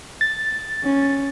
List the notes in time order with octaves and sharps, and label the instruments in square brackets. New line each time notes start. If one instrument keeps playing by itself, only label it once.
[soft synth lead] A6
[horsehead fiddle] C#4